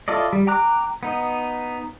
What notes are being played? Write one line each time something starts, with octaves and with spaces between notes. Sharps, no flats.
E4 F4 A4 D5 D#5
G3
G5 A#5 D6 F#6
B3 D#4